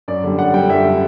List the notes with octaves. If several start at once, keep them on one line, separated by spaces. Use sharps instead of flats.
F#2 D5
D3 G3
F#2 F#5
D3 G3 G5
F#2 E5
D3 G3